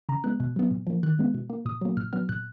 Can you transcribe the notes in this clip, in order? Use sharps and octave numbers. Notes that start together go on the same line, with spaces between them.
C#3 A#5
G#3 B3 F#6
B2
F#3 B3
A#2
F3 A#3
D#3 F#6
G#3 B3
B2
A#3
A#2 D#6
F#3 A#3
A#2 F6
F#3 B3 F6
A#2 F#6